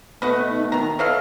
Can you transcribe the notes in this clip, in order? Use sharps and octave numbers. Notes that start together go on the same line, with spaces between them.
B2 A3 B3 B4 D#5 F#5
B3 D#4
B2 D#3 A#5
F#3 E4 A4 B4 D#5 F5